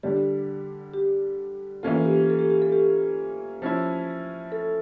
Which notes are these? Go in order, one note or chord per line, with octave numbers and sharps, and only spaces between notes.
D3 G3 D4 G4
G4
E3 A#3 C#4 F4 A4
G4
A4
G4
G4
A4
G4
F3 C#4 E4
A4